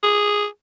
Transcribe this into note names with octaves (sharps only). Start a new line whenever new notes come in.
G#4